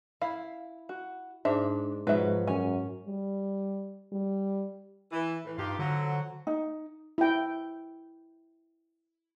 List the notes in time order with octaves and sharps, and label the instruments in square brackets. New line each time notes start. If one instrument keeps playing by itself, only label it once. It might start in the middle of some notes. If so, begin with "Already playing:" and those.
[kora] E4 [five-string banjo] F5
[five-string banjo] F#4
[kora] G#2 [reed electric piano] D4 [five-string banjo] E5
[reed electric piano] G#2 [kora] B2 F#3 [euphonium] F3 [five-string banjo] B4 E5
[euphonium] F#2 [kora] C#4 [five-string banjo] G#5
[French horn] G3
G3
[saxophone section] E3
A2 E3
[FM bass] G2 [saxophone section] D#4 F4 G4
[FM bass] D3 [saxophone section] F3 F#3
[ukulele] D#4
[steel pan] E4 G5